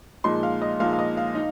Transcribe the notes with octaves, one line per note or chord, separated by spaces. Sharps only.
A#2 F3 G#3 D#4 C6
F5
D#5
A#2 F3 G#3 D#4 F5
F5
D#5
F5
D#4